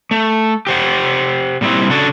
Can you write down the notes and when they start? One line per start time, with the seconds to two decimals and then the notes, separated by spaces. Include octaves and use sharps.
0.11 A3
0.67 G4 C5 F#5
1.61 A#2 G3 C4 E4
1.90 C#3 F#3 D4 F#4 A4